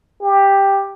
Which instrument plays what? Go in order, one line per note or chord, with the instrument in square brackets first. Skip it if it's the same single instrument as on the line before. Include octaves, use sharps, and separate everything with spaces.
[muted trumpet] G4